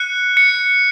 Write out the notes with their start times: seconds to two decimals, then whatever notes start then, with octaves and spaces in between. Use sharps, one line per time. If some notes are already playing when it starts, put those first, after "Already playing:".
Already playing: F#6 C#7
0.37 C#7